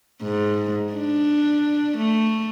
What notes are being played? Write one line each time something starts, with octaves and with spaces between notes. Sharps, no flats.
G#2
D4
A3